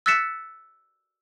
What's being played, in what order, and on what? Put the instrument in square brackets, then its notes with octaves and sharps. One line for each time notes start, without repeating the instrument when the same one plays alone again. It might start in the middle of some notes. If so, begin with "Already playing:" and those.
[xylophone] E6 F#6 A6 B6 C#7 E7